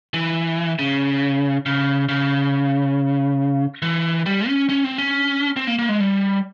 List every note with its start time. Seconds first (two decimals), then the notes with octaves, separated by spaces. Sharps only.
0.14 E3
0.79 C#3
1.66 C#3
2.09 C#3
3.82 E3
4.26 G3
4.48 C#4
4.69 C#4
4.84 C4
4.98 C#4
5.56 C4
5.67 A#3
5.79 A#3
5.89 G#3
6.00 G3